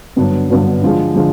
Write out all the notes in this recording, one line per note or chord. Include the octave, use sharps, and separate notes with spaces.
G2 D3 F#3 B3 D4
G2 D3 F#3 B3 D4
D3 F3 G#3
D3 F3 G#3